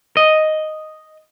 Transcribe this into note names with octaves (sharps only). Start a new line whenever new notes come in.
D#5